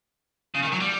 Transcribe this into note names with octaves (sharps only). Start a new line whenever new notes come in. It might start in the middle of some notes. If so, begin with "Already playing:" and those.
C#3
D#3
F#3
G3